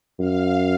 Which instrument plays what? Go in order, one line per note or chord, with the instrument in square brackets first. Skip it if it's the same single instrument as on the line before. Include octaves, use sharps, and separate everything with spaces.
[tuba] F#2 [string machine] F5